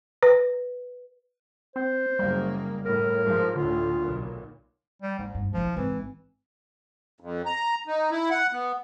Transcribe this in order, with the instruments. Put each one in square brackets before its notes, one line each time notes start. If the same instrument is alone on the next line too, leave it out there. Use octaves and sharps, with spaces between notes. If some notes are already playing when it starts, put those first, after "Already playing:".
[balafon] B4
[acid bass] C4 [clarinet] C5
[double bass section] F#1 A#3 [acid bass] G3
[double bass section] A2 [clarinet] A#4
[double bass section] G#2 F3
[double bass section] D2 A2 [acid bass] D3 [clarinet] F4
[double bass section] B1 A#2
[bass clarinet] G3
[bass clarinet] G#2 [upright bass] G3
[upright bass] G2
[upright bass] B1 E3 [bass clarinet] F3
[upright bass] G#1 [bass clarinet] E3
[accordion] F2
A#5
D#4
E4
F#5
B3